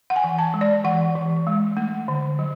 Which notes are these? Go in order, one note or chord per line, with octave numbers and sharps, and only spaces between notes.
F#5
G#5
E3
A5
G#3
D5
E3 F#5
E3
G#3
A3
D3
F#3